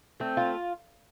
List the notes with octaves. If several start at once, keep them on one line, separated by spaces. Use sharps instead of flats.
A3 C4
F4